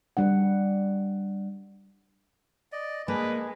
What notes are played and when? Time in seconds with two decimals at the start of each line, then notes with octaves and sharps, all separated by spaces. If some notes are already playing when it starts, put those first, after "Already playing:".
0.17 G3 D4 F#5
2.72 D5 D#5
3.08 G#3 A#3 D4 B4